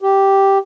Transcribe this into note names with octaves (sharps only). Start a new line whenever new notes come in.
G4